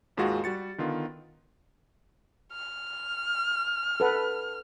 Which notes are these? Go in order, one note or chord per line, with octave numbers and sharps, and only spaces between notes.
G#1 D#2 G#3 F4 F#4
G3 F#4 A6 C#7
D3 D#3 B3 F4
F6
A4 B4 F#5